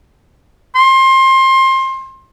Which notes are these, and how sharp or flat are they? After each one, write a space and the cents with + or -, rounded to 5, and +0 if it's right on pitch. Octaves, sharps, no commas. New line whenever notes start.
C6 +25